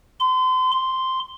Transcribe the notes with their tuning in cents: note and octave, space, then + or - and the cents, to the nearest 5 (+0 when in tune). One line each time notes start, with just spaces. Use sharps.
C6 -35
C6 -5